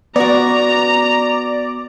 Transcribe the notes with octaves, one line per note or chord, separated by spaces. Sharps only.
B3 F#4 D5 A#5